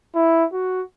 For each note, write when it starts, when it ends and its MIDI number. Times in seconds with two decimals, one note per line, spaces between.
0.15 0.45 64
0.53 0.82 66